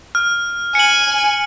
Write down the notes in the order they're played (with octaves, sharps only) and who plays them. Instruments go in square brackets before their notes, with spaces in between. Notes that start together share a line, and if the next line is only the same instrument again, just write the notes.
[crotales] F6
[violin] G#5 [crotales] C#7 F#7